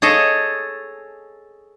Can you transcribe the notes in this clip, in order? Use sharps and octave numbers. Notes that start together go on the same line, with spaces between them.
G#4 A4 C#5 D#5 A5